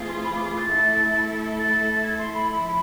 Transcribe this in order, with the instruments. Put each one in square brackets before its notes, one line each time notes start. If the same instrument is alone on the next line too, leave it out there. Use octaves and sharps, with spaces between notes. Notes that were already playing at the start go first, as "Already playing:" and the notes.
Already playing: [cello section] E3 A3 C4 F4 G#4
[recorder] C6
B5
D6
C6
A6
[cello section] A3 E4 A4
[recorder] A6
A6
G#6
C6
B5
[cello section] F3 A3 E4